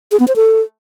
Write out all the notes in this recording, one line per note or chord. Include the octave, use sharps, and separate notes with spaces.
G#4
B3
C5
A4